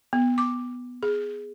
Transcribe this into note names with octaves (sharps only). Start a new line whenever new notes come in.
B3
D6
G#4